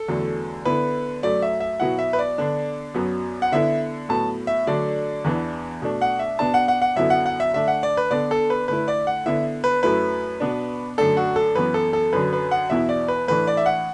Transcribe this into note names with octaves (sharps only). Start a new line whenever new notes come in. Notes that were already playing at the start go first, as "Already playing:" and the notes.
Already playing: A4
E2 D3 F#3 A3
D3 B3 E4 B4
F#2 F#3 A3 D5
E5
E5
B2 F#3 B3 E4 F#5
E5
B4
D5
D3 B3 D4
F#2 F#3 B3
F#5
D3 B3 E4 E5
A2 F#3 B3 A5
E5
D3 F#3 A3 D4 D5
E2 E3 B3 D4
B2 A3 D4
F#5
E5
B2 B3 D4 A5
F#5
F#5
F#5
F#2 D3 F#3 B3 E4 E5
F#5
F#5
E5
D3 A3 D4 E5
F#5
D5
B4
D3 B3 D4 D5
A4
B4
D3 A3 E4 B4
D5
F#5
D3 B3 E4 E5
B4
F#2 F#3 A3 E4 B4
B2 B3 D4
F#2 D3 A3 D4 A4
F#4
A4
F#2 E3 B3 B4
A4
A4
F#2 D3 F#3 B4
B4
F#5
E2 B2 B3 E4 E5
D5
B4
A2 E3 D4 B4
D5
E5
F#5